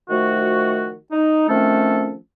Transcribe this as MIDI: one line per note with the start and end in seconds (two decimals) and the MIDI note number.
0.09 0.94 51
0.09 0.94 53
0.09 0.94 57
0.09 0.94 66
1.12 1.48 63
1.49 2.14 51
1.49 2.14 53
1.49 2.14 57
1.49 2.14 60
1.49 2.14 61
1.49 2.14 69